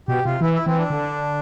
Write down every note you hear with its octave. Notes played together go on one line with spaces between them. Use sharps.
B2 G4
C3 F4
E3 E4
E4
E3 C4
D4
D3